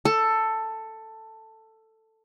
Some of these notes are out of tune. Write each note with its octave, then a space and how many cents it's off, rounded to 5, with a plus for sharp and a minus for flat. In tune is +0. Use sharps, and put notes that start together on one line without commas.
A4 +10